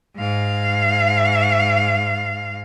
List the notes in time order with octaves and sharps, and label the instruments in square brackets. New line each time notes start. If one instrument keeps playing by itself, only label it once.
[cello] G#2 F5